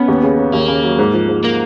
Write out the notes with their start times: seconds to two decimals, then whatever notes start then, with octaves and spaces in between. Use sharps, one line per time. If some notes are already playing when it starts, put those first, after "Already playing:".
Already playing: B3 C#4
0.08 D#2
0.23 C#3
0.39 C#3
0.53 D#2 A#3
0.68 C#3
0.84 F#3
0.99 G#2
1.14 F3
1.29 G#2
1.44 A#3